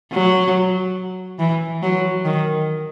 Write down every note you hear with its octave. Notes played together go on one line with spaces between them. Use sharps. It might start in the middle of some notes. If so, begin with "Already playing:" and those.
F#3
E3
F#3
D#3